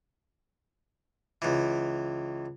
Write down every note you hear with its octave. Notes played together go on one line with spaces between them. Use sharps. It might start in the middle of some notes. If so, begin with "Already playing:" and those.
C#2 E3